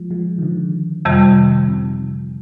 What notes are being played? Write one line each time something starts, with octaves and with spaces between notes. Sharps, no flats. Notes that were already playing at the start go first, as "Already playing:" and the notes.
Already playing: F3 G#3
F3 G#3
D#3
D3 F3
F2 C3 D#3 G3
C3 D#3